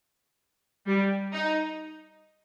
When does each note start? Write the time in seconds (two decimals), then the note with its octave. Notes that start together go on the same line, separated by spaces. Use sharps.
0.86 G3
1.33 D#4